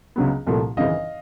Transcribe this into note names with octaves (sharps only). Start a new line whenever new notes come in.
C#2 C#3 F#3 B3
C2 A#2 F3 A3
G#1 F#2 C#3 E3 D#5 F5